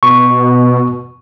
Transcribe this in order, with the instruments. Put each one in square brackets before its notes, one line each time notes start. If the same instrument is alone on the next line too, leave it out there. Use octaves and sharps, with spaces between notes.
[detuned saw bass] B2 [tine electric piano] C#6